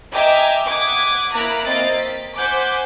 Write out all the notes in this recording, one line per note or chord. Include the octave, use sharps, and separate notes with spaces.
D#5 E5 G5 G#5 A#5 D6
F#5 D6 D#6 G#6 B6
A#3 E4 A#5 F#6 B6 D7
A#3 C4 D#5 A6 D7
B6
C5 F#5 G#5 D6 G6 B6